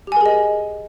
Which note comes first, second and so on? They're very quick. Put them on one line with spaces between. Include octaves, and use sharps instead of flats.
G4 G#5 A#4 G#4 D#5